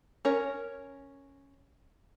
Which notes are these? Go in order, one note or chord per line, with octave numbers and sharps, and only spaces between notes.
C#4 A#4 C#5